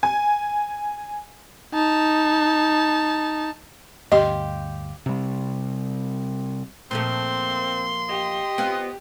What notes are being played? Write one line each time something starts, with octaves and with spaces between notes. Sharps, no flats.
G#5
D#4 A5
D2 G2 G4 D#5 F5 C6
C3 G3
A#2 F3 A3 C4 C6
G4 D#5
B3 C4 F4